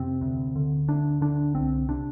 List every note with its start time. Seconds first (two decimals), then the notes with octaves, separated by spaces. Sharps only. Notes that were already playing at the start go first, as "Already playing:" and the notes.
Already playing: F2 C3 C4
0.21 D2
0.56 D3
0.88 D2 D4
1.21 D3 D4
1.55 C2 C4
1.88 C3 D4